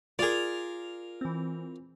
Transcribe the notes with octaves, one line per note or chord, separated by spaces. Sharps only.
F4 G#4 A#4 D5
E3 C4